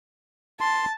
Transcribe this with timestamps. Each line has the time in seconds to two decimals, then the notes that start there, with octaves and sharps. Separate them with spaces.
0.61 A5 C6